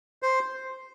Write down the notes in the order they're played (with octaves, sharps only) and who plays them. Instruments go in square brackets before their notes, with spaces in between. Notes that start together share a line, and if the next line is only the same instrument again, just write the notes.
[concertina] C5